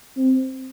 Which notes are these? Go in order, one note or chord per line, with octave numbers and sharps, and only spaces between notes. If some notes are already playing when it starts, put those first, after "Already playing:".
C4